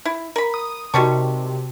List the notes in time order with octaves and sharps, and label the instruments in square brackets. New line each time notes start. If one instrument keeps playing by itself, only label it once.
[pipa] E4
A#4 B5
[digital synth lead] D#6
[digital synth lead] C3 [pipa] D#3 G3 C#6 [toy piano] F#4 A5